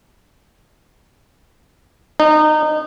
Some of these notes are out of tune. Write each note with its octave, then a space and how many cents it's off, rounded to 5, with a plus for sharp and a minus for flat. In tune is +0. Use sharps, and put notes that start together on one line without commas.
D#4 -25